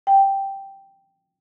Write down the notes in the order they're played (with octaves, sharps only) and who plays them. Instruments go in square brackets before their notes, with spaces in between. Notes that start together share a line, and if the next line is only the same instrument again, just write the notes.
[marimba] G5